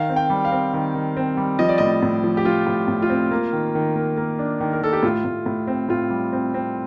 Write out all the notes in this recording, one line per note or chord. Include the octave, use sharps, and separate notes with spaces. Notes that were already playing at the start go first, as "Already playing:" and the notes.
Already playing: D#3 F5
C4
G5
G3
F5
C4
D#3
D#3
C4
G3
F3 D#5
D5
A2 D#5
A2
F3
G4
F3 F4
A2
A2
F4
C4
A#3
D#3
D#3
A#3
A#3
D4
D#3
A#4
D#3 A4
G4
A2 F4
A2
A2
C4
A2 F4
G3
C4
C4